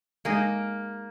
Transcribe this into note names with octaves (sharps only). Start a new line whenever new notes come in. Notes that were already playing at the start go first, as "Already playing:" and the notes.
G#3 A#3 D#4 G#4 D#5